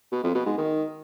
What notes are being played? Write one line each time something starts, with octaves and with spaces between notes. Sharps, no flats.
B2
F2
B2
G#2
D#3